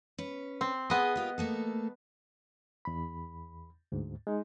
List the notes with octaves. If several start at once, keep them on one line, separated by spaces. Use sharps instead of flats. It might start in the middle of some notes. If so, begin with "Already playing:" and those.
C#4 B4
C4
B3 G#4 D#5
A#3 F4 G4
A3 A#3 A4
E2 B5
D2 G#2
G#3 D#4